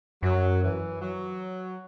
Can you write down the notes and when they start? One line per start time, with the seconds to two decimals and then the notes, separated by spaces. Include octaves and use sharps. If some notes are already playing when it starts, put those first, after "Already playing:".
0.23 F#2 F#3
0.62 E3
1.01 F#3